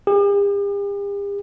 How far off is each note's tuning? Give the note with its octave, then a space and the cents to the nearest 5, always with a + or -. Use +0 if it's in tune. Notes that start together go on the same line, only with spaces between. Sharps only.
G4 +45